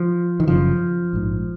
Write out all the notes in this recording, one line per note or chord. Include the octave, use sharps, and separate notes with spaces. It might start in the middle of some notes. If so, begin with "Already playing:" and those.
Already playing: F3
D#3
F#1 F#2 C#3 F3
A#1 G#2